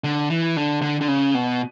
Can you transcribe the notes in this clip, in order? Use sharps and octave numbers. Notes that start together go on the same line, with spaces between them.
D3
E3
D3
D3
D3
C#3
B2